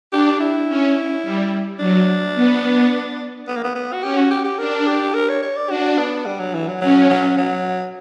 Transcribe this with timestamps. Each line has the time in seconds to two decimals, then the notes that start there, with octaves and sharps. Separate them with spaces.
0.12 D4 G4
0.40 E4
0.69 C#4
1.23 G3
1.79 F#3 D4
2.35 B3
3.47 B3
3.56 A#3
3.64 B3
3.75 B3
3.93 F#4
4.02 C#4 G4
4.16 F#4
4.31 G4
4.44 G4
4.59 D4 A#4
4.87 G4
5.14 A#4
5.29 C#5
5.42 C#5
5.56 D5
5.70 D4 F#4
5.98 B3
6.26 G3
6.39 F#3
6.54 E3
6.68 F#3
6.81 F#3 C#4
7.10 F#3
7.37 F#3